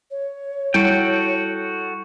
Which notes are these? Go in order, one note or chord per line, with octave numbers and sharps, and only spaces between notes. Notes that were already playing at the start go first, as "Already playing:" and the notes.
C#5
G3 E4 F#4 A4 G5 D#7